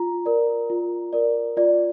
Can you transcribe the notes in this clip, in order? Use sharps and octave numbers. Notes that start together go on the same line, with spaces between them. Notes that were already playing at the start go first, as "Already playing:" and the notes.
Already playing: F4 A#5
A#4 D5
F4
A#4 D5
F4 D5